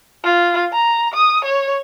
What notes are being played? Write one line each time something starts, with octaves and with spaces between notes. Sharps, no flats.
F4
A#5
D#6
C#5